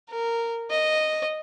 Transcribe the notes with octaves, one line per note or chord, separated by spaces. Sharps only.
A#4
D#5